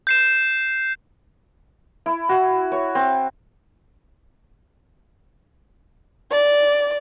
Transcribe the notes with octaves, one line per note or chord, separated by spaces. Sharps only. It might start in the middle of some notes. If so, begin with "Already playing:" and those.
G6 C7 E7
E4
F#4
C#5
C4
D5